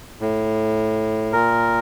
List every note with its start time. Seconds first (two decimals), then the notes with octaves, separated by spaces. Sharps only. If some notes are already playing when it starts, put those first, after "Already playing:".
0.20 A2
1.32 A#2 A#4